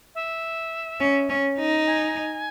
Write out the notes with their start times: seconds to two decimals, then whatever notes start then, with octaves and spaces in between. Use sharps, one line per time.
0.15 E5
1.00 C#4
1.29 C#4
1.58 D#4
1.87 G#5